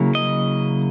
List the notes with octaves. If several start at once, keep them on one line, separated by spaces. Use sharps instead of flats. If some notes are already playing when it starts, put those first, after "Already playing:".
Already playing: C#3 F#3 A#3 E4
D#5